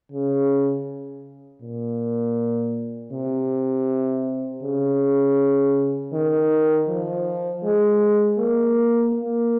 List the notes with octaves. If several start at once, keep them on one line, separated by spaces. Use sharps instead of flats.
C#3
A#2
C3
C#3
D#3
F3
G#3
A#3
A#3